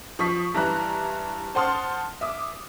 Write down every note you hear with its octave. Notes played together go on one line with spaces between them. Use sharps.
F3 C#6 D#6 B6
G2 E3 A#5 F#6
C5 F#5 A5 C6 D#6 F6
E5 D6 D#6